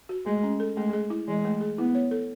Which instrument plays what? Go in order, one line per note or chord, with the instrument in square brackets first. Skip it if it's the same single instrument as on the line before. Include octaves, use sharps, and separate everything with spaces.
[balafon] F#4
[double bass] G#3 [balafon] A3
[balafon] C#4
A4
[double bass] G#3 [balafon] A3
[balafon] G#4
E4
[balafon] E3 [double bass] G#3
[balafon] A3
G#4
[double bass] B3 [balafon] E4
[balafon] C#5
A4